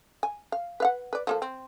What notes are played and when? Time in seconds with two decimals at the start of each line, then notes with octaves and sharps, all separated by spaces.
0.23 G#5
0.52 F5
0.80 B4 F5 F#5
1.13 B4 D5
1.27 F3 A#3 A4
1.42 C4